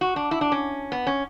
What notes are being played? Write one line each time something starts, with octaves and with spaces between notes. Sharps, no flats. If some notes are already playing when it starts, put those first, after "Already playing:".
F#4
D4
E4
D4
C#4
B3
C#4